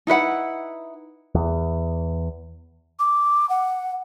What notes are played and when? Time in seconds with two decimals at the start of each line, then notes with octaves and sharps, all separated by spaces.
0.07 D#4 E4 B4 F#5
1.35 E2
2.99 D6
3.49 F#5